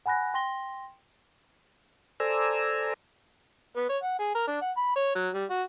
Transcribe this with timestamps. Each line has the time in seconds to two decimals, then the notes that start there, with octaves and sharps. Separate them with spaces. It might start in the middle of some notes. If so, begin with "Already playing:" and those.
0.06 F#5 G#5 B5 F#6 A#6
0.34 G5 C6 A#6 G7
2.20 A4 C5 D5 G#5 A#5 E6
3.76 B3
3.89 C#5
4.03 F#5
4.19 G#4
4.35 A#4
4.47 D4
4.62 F#5
4.77 B5
4.96 C#5
5.16 F#3
5.34 G3
5.50 F#4